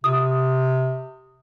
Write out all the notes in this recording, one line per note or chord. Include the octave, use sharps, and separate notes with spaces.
C3 D#6